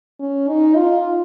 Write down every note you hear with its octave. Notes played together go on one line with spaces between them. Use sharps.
C#4
D#4
F4